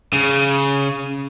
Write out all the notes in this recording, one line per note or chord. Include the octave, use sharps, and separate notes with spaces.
C#3